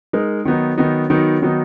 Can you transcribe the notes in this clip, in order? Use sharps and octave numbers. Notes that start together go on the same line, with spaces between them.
G#3 D#4 A#4
D#3 F#3 B3 D#4
D#3 F#3 B3 D#4
D#3 F#3 B3 D#4
D#3 F#3 B3 D#4